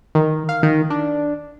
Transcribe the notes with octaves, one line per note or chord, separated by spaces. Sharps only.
D#3
F5
D#3
D4